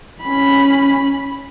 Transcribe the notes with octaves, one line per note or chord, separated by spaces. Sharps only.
C#4 B5